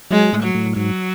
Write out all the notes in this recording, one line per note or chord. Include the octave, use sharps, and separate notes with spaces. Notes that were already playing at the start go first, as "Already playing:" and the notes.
F#3 G#3
A2
F#3
A2
G#2 F#3